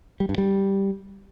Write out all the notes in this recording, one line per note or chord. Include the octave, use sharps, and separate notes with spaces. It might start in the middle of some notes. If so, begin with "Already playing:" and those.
G3
G2
G3